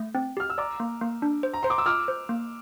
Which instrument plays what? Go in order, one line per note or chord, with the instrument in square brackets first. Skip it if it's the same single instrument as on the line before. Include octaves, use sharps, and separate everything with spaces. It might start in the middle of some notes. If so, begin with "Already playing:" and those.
Already playing: [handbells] A3
C4
[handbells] G4 [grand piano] F6
[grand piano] E6
[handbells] D5 [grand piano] A#5 D6
[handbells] A#3
A#3
D4
C5
[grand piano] A#5
[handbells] C5 [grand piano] C6
[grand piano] D6
E6
[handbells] F4 [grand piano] D6 F6
[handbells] C5
A#3